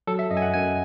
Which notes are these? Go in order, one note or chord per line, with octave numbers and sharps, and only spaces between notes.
F#3 A4
E5
F#2 D#5
G#5
F#5
F#2 G#5